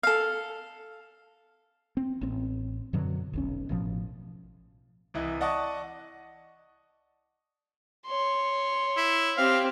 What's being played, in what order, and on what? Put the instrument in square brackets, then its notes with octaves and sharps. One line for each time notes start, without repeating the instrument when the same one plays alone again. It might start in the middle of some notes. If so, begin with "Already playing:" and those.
[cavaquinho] A4 F5
[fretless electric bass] C4
A1 C4
F#2 B2 D3 F#3
F1 B1 C#4
A1 B2 F3
[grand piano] C2 E3 E4 D#5
D5 D#5 F#5 A5 C#6 D#6
[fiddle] C#5 C6
[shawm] E4
[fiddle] C4 G4 [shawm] F5